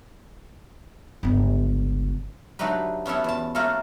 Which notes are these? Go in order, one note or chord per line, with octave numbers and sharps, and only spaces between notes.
G1 C#2
D3 F#3 A3 D#4 G4 B4
B3 C#4 E4 A4
E2 A5
A3 A#3 C#4 F4 F#4 A4